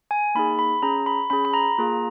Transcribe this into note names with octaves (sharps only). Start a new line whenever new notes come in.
G#5
A#3 D#4 G#4 B5
B5
C#4 G#4 A#5
B5
C#4 G#4 B5
B5
A#5
A#3 F4 G#4